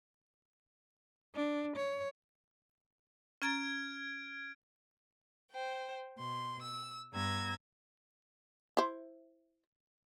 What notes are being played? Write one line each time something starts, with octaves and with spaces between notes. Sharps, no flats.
D4
C#5
C#4 A#5 F6 G#6 A6 D7
C5 G5
B2 C6
E6
G2 B3 A#5 E6 G#6 A#6
E4 C5